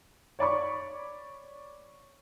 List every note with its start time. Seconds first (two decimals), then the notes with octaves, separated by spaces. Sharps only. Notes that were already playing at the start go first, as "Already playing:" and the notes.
0.39 C#5 D5 B5 C#6